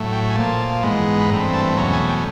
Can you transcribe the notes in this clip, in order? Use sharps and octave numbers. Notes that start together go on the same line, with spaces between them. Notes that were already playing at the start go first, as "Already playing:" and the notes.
Already playing: A2 F#3 A3
G5
G#5
A#2 F3 A#3 A5
G#2 E3 G#3 B3
B5
G2 E3 A3 C4 A#5
A5
E2 B2 F#3 A3 C#4 A#5
G#5
G5